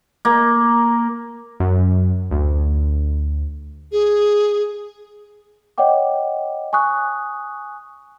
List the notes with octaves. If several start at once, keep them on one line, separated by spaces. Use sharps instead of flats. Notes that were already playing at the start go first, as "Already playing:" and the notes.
A#3
F#2
D2
G#4
C#5 D#5 F#5 G5 D6
G#5 C#6 D#6 F#6